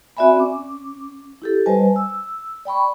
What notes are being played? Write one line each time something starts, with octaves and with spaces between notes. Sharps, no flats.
C4 F#4 D5 E5 G#5 B5
C#4 D6
E4 G4 A4
G3 B4 C5 D#5 G#5 A5
E6
D5 G5 B5 C#6